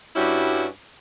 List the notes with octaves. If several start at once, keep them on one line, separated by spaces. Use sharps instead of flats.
G2 G3 C#4 E4 F#4